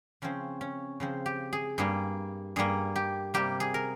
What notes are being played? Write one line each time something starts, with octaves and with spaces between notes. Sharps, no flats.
C#3 F3 C4 C#4
C#4
C#3 F3 C4
G4
G#4
G2 G3 A#3 G#4
G2 G3 A#3 G#4
G4
C3 G3 A#3 G4
G#4
A#4